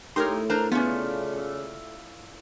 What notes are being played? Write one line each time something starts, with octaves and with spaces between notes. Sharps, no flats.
A2 D#4 G4 A#4 C#5 C6 F6
D4 A#4 C5 A#5
C#3 A3 B3 C#4 F4 D5
E5